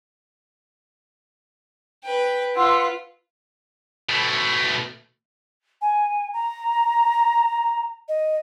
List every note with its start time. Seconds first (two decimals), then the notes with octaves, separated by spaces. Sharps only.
2.04 B4 G5
2.55 F4 B4 F#5 C6 E6
4.10 B2 A3
5.81 G#5
6.33 A#5
8.08 D#5